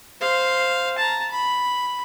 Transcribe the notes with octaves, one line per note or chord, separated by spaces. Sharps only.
C5 F5
A5 A#5
B5